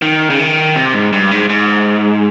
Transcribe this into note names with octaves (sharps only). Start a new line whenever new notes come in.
D#3
C#3
D#3
C3
G#2
G2
G#2
G#2